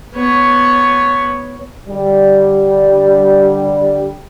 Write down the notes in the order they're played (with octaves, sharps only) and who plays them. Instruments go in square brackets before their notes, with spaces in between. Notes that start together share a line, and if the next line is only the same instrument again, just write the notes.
[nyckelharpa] B3 C#5
[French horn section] D3 G3